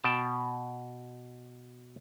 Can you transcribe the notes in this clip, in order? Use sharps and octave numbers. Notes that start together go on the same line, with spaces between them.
B2 G5 A5